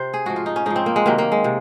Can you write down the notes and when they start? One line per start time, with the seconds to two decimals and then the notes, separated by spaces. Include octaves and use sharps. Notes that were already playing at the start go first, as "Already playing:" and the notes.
Already playing: C3 C5
0.14 G#4
0.26 G#2 F3 F#4
0.36 F4
0.46 D#4
0.56 C#4
0.66 G#2 F3 D#4
0.76 C4
0.86 A#3
0.96 G#3
1.06 C3 D#3 F#3 A#3
1.18 A#3
1.32 G#3
1.44 C3